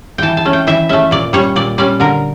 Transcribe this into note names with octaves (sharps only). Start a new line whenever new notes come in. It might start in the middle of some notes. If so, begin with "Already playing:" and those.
E3 G5 A5
A5
A3 C#4
G5
E3 E5
A3 C#4 E5
A#2 D5
G3 C#4 C#5
A#2 D5
G3 C#4 D5
D3 A#4